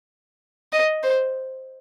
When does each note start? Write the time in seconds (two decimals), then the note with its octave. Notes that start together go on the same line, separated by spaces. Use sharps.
0.72 D#5
1.03 C5